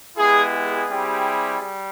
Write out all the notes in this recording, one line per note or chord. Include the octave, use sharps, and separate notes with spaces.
G#3 B3 E4 G4 G#4
G#4
G3 C4 E4 G4
G3